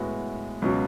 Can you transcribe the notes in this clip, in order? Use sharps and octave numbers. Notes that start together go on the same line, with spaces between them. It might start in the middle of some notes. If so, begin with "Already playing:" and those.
Already playing: A2 G#3 B3 F#4
C#2 B2 F#3